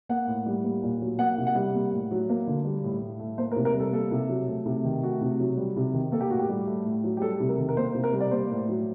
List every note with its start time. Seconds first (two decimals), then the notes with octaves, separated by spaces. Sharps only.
0.09 A#3 F#5
0.27 A2
0.46 G3
0.64 A#3
0.83 A#2
1.01 F#3
1.19 A#3 F#5
1.38 C3
1.47 F#5
1.55 G3
1.74 A#3
1.93 A2
2.11 F#3
2.29 A#3
2.47 D3
2.65 G3
2.83 A2
3.01 A2
3.19 A3
3.38 A#3 C5
3.51 A#4
3.56 C3
3.65 A#4
3.75 G3
3.80 A4
3.93 A#3 A4
4.12 C3
4.29 F#3
4.48 A3
4.66 C3
4.84 D#3
5.03 A3 F#4
5.21 C3
5.40 F#3
5.57 G3
5.76 C3
5.94 D#3
6.12 A#3 A4
6.21 G4
6.30 A2 F#4
6.39 G4
6.49 G3
6.67 A3
6.85 A2
7.04 F#3
7.17 G4
7.21 G3 A4
7.40 C3
7.49 A#4
7.58 D#3
7.69 A#4
7.77 A#3 C5
7.94 C3
8.04 A#4
8.13 G3
8.20 D5
8.31 A#3 C5
8.50 A2
8.69 F#3